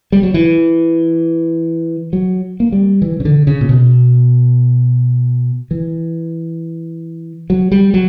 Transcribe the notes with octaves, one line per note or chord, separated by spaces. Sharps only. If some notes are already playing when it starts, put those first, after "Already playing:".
G3
F#3
E3
F#3
A#3
G3
E3
C#3
D3
C#3
A#2
B2
E3
F#3
G3
F#3